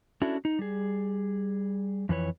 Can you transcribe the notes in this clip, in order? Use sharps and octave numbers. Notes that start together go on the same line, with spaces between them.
C#4 D4 E4 F#4 A4
D#4
G3 G#4
F2 E3 B4 C#5